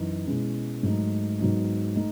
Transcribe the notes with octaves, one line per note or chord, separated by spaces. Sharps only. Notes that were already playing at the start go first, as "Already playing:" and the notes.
Already playing: F#2 E3 D#4
B2 G#3 C#4 E4
G#2 F#3 A3 D#4
G#2 F#3 B3 D#4
A3 D#4